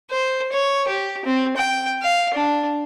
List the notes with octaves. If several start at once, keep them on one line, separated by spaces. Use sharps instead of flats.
C5
C#5
G4
C4
G5
F5
D4